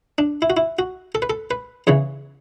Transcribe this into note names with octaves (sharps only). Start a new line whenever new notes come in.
D4
E4
F#4
E4
F#4
A4
B4
A4
B4
E2 C#3 E3 C#5